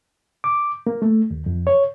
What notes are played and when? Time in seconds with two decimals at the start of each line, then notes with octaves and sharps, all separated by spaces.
0.44 D6
0.87 A#3
1.02 A3
1.31 D#2
1.46 F2
1.67 C#5